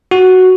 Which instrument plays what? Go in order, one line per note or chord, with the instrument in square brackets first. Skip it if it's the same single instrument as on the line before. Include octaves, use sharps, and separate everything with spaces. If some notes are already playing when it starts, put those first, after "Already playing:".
[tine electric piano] F#4